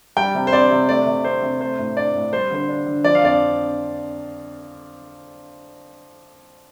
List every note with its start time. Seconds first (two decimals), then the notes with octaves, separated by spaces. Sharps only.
0.17 G3 G5
0.35 C3
0.47 C5
0.53 C4 D5
0.71 C3
0.88 A3 D5
1.06 C3
1.24 C4 C5
1.43 C3
1.61 A3 C5
1.79 A2
1.97 D4 D5
2.15 A2
2.33 G3 C5
2.51 D3 C5
2.69 D4
2.87 D3
3.04 F3 D5
3.15 F5
3.23 F2 D5